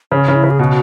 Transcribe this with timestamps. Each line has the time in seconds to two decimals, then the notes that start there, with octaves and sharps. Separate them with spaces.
0.12 C#3 C#4
0.28 C#3
0.35 E4
0.43 C#3
0.50 G#4
0.59 B2 F#4